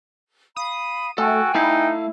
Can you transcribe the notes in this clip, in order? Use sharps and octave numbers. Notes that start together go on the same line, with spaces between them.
F5 B5 D#6
A3 F#4 A4 G5 G#5
A3 D#4 E4 F5